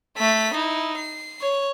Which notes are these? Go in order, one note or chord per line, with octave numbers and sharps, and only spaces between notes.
A3 B6
D#4 E4
C7
C#5